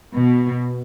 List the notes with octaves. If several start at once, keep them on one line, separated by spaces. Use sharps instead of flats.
B2